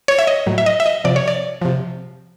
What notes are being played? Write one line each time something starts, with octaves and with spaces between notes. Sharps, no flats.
C#5
E5
D#5
A2 F#3
E5
D#5
E5
D#5
C3 F3 D5
C#5
D5
C3 F3